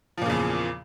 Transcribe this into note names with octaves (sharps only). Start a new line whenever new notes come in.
E2 A#2 C#3 F3